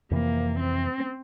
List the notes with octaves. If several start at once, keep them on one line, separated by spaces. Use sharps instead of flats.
F2 C3 E3 A#3
C4